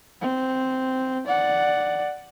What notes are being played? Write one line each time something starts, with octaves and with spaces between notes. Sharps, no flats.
C4
D5 F#5